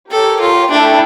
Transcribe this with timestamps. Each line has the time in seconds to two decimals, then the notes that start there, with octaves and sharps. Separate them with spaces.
0.11 G4 A4 A#4 C#5
0.41 F4
0.70 A3 D4 E4 A4 E5 G5